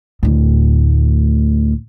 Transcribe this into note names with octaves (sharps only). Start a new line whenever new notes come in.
D2 A2